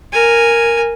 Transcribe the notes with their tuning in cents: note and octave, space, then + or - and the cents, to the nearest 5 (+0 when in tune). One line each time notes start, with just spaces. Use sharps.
A#4 +0 G#5 -5